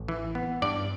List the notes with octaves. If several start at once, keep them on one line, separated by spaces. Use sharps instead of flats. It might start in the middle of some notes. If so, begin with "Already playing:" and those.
Already playing: A1
E3
B3
G2 D5